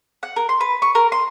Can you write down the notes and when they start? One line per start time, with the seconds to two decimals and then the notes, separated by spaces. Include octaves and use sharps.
0.23 F#5
0.36 A#4
0.49 C6
0.61 B4
0.82 C#6
0.95 A#4
1.12 C6